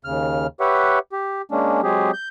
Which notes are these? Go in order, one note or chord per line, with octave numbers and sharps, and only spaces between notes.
D#2 C#3 F6
G4 B4 C#5 E5 F#5
G4
G#3 A#3 C#4 D4
F#3 G#3 C4 G4 G#4
G6